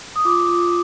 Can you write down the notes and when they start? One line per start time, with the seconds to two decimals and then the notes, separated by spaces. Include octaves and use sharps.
0.16 D#6
0.25 F4 D6
0.49 F4